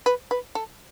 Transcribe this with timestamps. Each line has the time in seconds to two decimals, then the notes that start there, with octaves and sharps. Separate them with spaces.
0.06 B4
0.31 B4
0.55 A4